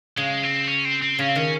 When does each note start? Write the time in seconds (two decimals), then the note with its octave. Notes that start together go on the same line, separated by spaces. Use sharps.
0.17 C#3 G#3
0.43 C4
0.68 C#4
0.85 C4
1.02 C4
1.19 C#3 C#4
1.28 C4
1.35 D#3 C#4